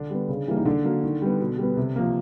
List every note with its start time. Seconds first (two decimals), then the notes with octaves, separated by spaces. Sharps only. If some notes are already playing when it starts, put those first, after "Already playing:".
Already playing: D3 D4
0.10 G3 B3
0.29 C#3
0.48 E3 G3 A#3
0.57 D#4
0.65 D3 D4
0.84 F#3 A#3
1.04 D#3
1.22 G3 B3
1.40 B2
1.58 G3 B3
1.77 C3
1.96 F3 A#3